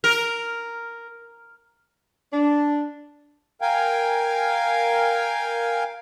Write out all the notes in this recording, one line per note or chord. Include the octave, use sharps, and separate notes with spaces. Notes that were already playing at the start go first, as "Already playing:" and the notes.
A#4
D4
A#4 F5 G5 G#5